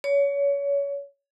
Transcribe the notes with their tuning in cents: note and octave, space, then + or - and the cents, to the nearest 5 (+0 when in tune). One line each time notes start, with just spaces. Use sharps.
C#5 +25